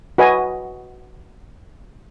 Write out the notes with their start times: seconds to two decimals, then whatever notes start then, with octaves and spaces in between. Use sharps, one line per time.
0.18 F#4 B4 D#5 G#5